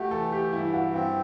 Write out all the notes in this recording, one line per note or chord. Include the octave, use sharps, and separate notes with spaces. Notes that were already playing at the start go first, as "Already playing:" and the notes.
Already playing: A3 F#4 G4
E3 A4
G4
G2 E4
F#4
C4 F#4